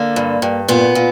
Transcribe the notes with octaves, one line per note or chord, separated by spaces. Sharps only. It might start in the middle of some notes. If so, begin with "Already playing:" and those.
Already playing: D3 A#3
G2
G2
A#2 B3
A#2